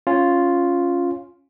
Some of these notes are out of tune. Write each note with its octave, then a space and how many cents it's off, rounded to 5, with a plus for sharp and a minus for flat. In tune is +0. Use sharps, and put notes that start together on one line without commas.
C#4 +0 F4 +0